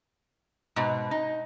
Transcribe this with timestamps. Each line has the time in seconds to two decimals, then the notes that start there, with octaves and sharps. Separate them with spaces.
0.76 G#2 B2
1.11 D#4